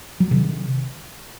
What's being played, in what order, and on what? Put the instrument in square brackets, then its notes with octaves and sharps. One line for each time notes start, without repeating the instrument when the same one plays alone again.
[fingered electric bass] F#3
C3 D#3